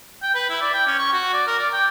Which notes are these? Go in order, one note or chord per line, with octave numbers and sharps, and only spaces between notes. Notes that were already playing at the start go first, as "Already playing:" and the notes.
G5
B4
E4
D5
G5
C#4
C#6
F#4
D5
A#4
D5
G5